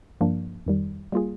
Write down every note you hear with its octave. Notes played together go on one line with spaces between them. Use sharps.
G2 F3 A#3 D4
F2 D#3 G3
G3 A#3 F4 G#4